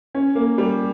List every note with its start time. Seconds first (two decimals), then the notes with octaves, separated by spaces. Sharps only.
0.15 C#4
0.35 A#3
0.58 G3